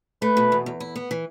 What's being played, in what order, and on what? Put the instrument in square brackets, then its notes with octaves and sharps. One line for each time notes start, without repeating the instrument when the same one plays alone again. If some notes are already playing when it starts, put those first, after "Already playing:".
[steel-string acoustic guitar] A3 [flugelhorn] B4
[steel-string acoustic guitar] B2
E2
E2
E4
B3
E3